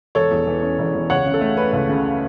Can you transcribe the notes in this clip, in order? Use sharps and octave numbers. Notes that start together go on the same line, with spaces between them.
E1 A4 C#5
E2
E3
C#4
E1
E2
C#2 C#5 F#5
C#3
A4
A3
C#4 B4
C#2
C#3